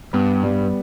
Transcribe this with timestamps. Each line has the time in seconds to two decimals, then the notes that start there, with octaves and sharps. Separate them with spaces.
0.13 G2 B3
0.43 G3